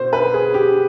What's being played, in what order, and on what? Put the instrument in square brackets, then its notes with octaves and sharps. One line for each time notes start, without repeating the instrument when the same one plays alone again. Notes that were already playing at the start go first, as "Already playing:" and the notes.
Already playing: [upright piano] B2 C5
B4
G#4
G4